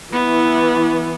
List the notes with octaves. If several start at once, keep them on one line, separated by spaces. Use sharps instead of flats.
E3 B3